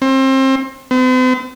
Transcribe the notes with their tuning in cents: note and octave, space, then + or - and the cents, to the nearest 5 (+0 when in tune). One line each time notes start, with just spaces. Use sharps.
C4 +30
C4 -45